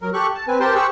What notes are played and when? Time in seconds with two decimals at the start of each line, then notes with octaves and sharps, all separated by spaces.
0.01 F#3 A#4
0.14 G4 A4 C#6 F#6
0.35 A5
0.48 C4 B4 G#5
0.60 G4 A#4 C5 G5 A5 C6
0.75 G4 G#4 C5 C#6 E6 F#6